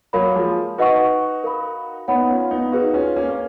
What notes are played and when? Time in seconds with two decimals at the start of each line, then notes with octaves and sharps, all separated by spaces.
0.13 F#3 A#3 A#4 C#5 F5 B5
0.36 F3 G#3
0.78 D#4 F#4 B4 D#5 F#5 C#6
1.44 A#4 F5 B5
2.08 B3 D#4 C#5 F#5 B5
2.30 C#4 F4
2.51 B3 D#4
2.72 D#4 F#4 G#4 B4 F5
2.94 C#4 F4
3.16 A#3 C#4
3.28 C#4